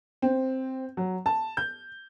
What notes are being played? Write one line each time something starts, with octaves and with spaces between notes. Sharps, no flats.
C4
F#3
A5
G6